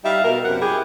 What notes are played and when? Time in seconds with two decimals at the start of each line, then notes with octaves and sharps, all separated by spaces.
0.05 G3 D#4 E5 F5
0.24 B2 A#4
0.44 F#2 C3 F#5
0.61 E4 G4 G#4